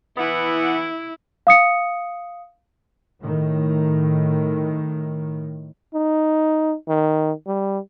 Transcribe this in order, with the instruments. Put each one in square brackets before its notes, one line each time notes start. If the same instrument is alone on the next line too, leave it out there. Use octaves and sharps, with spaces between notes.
[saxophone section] E3 B3 F#5 [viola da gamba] E4
[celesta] F5 D#6 C#7
[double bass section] A2 D#3
[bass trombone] D#4
D#3
G3